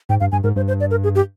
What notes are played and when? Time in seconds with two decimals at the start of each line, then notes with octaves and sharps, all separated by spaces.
0.09 G#2 G5
0.20 G2 F5
0.32 G2 G#5
0.44 G#2 A#4
0.56 G2 C5
0.68 C5
0.80 D5
0.91 A#4
1.04 G#4
1.15 G4